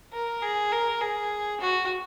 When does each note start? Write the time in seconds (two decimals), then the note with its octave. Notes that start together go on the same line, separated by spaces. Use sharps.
0.13 A#4
0.43 G#4
0.72 A#4
1.01 G#4
1.61 F#4